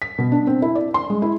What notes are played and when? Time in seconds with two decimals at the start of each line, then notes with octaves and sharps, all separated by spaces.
0.02 B6
0.18 B2
0.32 D4
0.47 C4
0.62 E4
0.75 D5
0.94 C6
1.10 G#3
1.22 E4